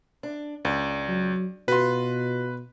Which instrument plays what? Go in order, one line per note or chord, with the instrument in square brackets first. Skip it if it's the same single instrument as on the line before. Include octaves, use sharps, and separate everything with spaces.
[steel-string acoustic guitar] D4
[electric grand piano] C#2 [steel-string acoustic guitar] D5
[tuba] F#3
[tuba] B2 [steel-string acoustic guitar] F4 F#4 [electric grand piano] B4 C6